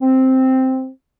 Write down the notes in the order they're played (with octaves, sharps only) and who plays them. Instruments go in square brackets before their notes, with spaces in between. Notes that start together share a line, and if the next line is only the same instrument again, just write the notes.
[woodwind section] C4